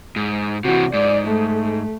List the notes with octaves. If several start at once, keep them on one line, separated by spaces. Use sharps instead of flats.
G#2
C3 E3 F#4
G#2 D5
A3